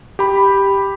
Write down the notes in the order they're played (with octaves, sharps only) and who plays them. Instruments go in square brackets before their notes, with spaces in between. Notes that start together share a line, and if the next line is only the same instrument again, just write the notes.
[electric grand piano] G4 B5